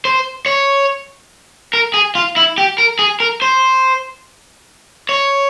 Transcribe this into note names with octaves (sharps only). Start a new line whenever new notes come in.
C5
C#5
A#4
G#4
F4
E4
G4
A#4
G#4
A#4
C5
C#5